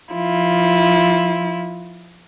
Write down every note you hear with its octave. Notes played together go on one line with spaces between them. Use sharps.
F3 E4 F4